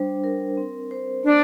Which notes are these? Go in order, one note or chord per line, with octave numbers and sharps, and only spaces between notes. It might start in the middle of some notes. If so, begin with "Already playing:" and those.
Already playing: G3 D4 C5
A#4
C4
C5
A#3 D4